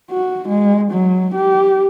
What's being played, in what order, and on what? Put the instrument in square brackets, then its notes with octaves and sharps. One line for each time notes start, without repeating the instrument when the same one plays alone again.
[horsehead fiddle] F#4
G#3
F#3
G4